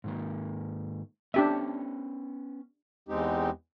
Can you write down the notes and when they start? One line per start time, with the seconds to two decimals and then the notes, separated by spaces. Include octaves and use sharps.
0.04 G#2 D#3 A#3
1.34 B3 C#4 D4 G4 E5 A5
3.09 E2 G#3 C4 D#4 G4